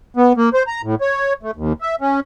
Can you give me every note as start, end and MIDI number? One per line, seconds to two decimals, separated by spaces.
0.17 0.33 59
0.37 0.49 58
0.54 0.63 72
0.67 0.82 82
0.83 0.95 45
1.01 1.33 73
1.43 1.51 57
1.56 1.73 39
1.81 1.96 76
2.01 2.20 61